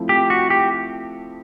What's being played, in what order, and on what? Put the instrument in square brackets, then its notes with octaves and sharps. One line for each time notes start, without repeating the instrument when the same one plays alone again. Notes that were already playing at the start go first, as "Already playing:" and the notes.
Already playing: [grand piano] F3 A3 C4 E4
[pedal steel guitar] G4
F#4
G4